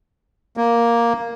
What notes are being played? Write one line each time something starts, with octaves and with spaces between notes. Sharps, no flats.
A#3